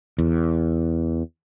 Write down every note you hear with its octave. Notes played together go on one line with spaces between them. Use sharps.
E2